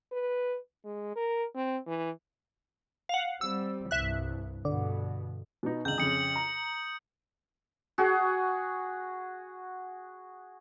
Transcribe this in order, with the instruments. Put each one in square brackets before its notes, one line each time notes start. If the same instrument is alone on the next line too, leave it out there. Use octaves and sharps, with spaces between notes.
[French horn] B4
G#3
A#4
C4
E3
[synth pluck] F5 F#5
[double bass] G3 C4 [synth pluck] E6
[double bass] C2 G2 [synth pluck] E5 F#6
[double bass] G2 B2 [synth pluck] D3
[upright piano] B2 B3 D#4
[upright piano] G1 C#2 [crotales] G6 F#7
[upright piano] F2 C#3 [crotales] D#6 C#7
[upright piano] A#5
[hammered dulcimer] F#4 G#4